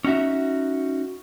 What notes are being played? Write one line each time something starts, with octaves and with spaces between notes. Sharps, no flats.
C#4 D#4 F#4 E5